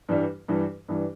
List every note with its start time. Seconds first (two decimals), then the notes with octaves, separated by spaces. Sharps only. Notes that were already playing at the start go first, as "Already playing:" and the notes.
0.09 G2 E3 G3
0.48 G2 E3 G3
0.88 G2 E3 G3